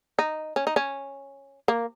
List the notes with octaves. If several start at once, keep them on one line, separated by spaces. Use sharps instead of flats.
D#4
C#4
D#4
C#4
A#3